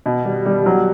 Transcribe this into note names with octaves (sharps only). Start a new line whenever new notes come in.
B2
G3
G3
F#3